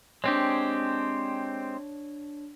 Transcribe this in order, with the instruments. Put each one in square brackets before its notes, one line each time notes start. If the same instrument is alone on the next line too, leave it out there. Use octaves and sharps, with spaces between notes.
[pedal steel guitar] G#3 C4 G4 [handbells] D4 C#5